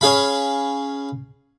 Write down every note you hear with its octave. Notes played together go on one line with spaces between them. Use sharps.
C#4 G#4 F5 B5